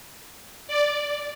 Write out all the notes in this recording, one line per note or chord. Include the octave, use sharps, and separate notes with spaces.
D5